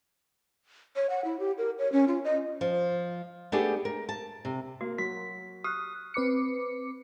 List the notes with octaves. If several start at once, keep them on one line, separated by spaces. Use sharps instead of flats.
C#5
F#5
E4
G4
A#4
C#5
C#4
F4
D#5
F3
A3 B3 D4 G4 G#4
A#4
A5
C3
A#3 F#4
F#3 F#4 B6
G4 D#6 F6 F#6
C4 B4 D6 C#7